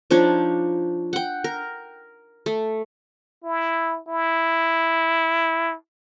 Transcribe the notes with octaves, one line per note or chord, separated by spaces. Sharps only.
F3 D4 D#4 C#5
F#5 G5
A#4
A3
E4
E4